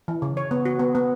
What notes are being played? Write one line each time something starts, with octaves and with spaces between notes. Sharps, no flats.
E3
C#3
C#5
B3
F#4
B3
B3